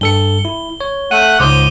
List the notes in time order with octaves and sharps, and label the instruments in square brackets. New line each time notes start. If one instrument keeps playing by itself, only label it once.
[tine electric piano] G2 A4 C#7 [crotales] G7
[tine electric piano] E4
C#5
[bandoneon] A3 F#5 F#6 [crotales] D#7
[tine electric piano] C#2 C5 D#6 [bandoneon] G#2 [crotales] D6 G7